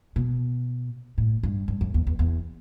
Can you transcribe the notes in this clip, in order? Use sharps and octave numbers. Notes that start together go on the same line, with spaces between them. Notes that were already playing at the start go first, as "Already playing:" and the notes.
B2
A2
G2
G2
F#2
E2
E2
E2